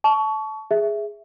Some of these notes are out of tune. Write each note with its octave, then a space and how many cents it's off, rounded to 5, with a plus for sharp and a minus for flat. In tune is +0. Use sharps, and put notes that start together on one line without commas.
A5 -20 C#6 +25
G#4 +0 E5 +0